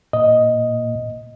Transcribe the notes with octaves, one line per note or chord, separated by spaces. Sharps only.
A#2 D#5